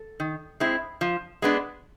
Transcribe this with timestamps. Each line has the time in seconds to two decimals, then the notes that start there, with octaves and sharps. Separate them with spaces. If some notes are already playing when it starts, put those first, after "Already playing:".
Already playing: A4
0.20 D#3
0.60 G#3 C4 E4
1.01 F3
1.42 G#3 B3 D4